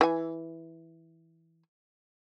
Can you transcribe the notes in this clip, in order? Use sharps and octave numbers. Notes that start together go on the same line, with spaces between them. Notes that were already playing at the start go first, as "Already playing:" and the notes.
E3 G#5